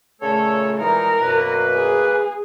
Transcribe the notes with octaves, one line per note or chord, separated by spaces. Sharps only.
A#2 C#3 A3 A4 C#5
A#2 E3 G#3 D#4 A#4
F#2 B2 A#3 B4
G#4